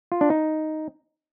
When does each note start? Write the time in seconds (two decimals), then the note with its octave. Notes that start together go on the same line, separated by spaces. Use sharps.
0.12 F4
0.21 D4
0.30 D#4